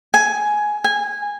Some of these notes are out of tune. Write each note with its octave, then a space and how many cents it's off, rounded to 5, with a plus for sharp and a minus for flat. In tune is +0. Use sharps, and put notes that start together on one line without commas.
G#5 +10
G#5 -15